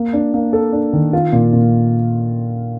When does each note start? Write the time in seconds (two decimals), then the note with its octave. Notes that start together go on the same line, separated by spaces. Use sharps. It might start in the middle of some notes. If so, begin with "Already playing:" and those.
Already playing: A#3
0.13 D4
0.34 A#3
0.53 A4
0.73 D4
0.93 D#3
1.13 F4
1.32 A#2
1.53 A#2